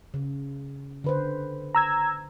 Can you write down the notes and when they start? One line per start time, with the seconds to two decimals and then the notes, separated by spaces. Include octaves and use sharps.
0.14 C#3
1.04 D3 B4 C5
1.75 A#5 E6 G#6